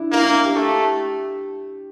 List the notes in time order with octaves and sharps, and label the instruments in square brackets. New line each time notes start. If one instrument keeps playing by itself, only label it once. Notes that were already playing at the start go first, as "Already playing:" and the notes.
Already playing: [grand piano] D4 E4
[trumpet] A#3 [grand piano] E4
[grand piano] D4
D4
G4
[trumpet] A3 [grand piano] G4